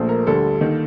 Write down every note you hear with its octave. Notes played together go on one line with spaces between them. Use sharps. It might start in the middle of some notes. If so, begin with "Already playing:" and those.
Already playing: A#1 A#2 A3 C5
A#4
D2 D3 G3 A4
D#3 A#3